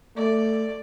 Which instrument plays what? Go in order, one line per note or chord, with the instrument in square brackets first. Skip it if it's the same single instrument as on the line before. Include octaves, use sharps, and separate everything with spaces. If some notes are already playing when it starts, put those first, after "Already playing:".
[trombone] A3 [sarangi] D5